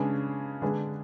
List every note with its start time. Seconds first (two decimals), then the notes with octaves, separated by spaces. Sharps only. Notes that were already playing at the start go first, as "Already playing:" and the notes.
Already playing: C#3 G#3 D4 G#4 B4
0.62 D3 G#3 D4 G#4 B4